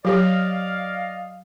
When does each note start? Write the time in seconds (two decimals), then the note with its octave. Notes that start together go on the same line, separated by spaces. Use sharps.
0.05 F#3 G4 D5 D#5 F5